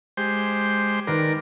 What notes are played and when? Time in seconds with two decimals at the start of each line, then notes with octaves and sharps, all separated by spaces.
0.17 G#3 G4 C5
1.07 D#3 A#4 B4 D5